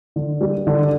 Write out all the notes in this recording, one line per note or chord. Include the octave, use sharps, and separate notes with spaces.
D3
G3
D3